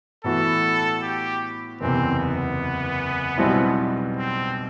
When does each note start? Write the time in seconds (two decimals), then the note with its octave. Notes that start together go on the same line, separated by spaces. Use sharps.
0.24 A2 E3 B3 F#4 A4
1.02 G4
1.80 F#1 E2 C3 C4
2.20 B3
3.37 B1 B2 G3 C4 E4
4.17 C4